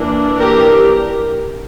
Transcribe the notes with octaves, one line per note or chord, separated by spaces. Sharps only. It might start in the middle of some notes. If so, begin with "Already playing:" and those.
Already playing: E3 A#3 D4
G4 A#4